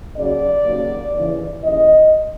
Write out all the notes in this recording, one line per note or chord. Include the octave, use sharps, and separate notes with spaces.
D#2 C#3 F#3 D5
D#2 C#3 F#3 A#3
D#2 C#3 E3
D#2 C#3 E3 D#5